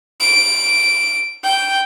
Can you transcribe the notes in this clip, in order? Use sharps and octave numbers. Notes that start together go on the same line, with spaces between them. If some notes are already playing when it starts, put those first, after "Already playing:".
D7
G5